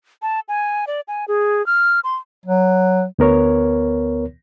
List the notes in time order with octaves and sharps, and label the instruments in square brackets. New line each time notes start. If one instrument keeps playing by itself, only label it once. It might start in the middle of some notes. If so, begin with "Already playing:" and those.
[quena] A5
G#5
D5
G#5
G#4
F6
C6
[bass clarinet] F#3
[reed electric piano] D2 B3 A#4 C#5